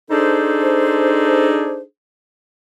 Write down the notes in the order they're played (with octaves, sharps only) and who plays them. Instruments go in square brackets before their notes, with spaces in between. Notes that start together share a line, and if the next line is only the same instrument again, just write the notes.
[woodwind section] D4 D#4 G#4 A4 C5